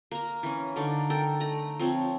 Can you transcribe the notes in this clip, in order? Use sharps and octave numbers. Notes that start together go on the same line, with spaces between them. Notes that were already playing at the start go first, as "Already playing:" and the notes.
A#3 A#5
E3 C#4
D3 D#4 D5 C#6
A4 A#4 G5 A#5
A3 A#5
F3 C4 C#5